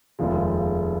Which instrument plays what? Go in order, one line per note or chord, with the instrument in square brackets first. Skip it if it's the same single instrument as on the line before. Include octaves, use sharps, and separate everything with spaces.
[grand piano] F1 D#2 C#3 F3 G#3